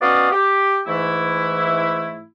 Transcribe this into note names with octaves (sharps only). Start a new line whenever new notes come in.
B3 C#4 F#4 D5 D#5 F5
G4
G#2 E3 A3 E4